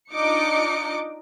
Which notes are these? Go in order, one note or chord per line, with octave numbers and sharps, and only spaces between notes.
D4 D#4 F4 D#5 D6 C#7